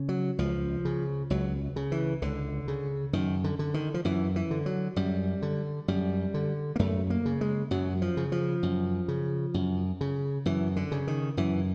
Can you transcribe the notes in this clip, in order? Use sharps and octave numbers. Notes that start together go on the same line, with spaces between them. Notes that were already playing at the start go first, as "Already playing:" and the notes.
Already playing: C#3
F#3
C#2 F3
C#3
C#2 F#3
C#3
E3
C#2 D3
C#3
F#2 D#3
D3
D3
D#3
F3
F#2 E3
E3
D3
F#3
F#2 G3
D3
F#2 G3
D3
A#3
F#2 A3
A#3
C#3
G#3
F#2 F#3
F3
C#3
F3
F#2
C#3
F#2
C#3
F#2 E3
D3
C#3
D#3
F#2 E3